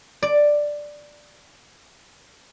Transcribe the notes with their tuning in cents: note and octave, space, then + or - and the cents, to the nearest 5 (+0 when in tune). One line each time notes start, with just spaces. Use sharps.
D5 +5